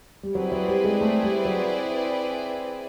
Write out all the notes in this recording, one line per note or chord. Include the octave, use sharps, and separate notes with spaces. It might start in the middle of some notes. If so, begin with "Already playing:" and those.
G3
F#3 C4 E4 G#4 B4 D5
F#3
G3
G#3
A3
G3
F#3